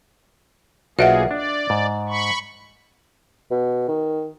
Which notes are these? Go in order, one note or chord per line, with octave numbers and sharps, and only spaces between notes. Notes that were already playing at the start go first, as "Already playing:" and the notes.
B1 A#3 F4 F#4 G#4 D#5 E5 F#5
D4 D5
G#2
B5 C#6
B2
D#3